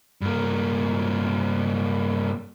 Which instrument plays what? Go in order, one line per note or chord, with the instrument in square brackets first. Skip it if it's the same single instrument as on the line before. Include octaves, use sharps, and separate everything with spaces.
[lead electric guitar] G2 A#3